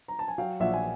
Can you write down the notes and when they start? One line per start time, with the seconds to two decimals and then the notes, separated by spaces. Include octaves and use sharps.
0.08 A#5
0.19 A5
0.28 G#5
0.38 F#3 F5 G5
0.60 A#1 E5 F#5
0.74 G#5